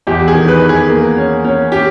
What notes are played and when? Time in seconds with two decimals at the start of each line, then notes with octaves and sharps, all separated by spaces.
0.07 E2 G4
0.28 G#4
0.34 D#3
0.48 B4
0.62 E2
0.69 G#4
0.89 A#3
1.17 C#4
1.44 C#4
1.72 C#4 G4